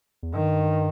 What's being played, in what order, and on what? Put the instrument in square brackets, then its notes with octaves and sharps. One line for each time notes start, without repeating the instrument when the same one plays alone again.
[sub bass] E2
[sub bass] G2 [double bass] D#3